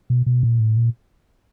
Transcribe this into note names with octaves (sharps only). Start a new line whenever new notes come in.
B2
B2
A#2
A2
A#2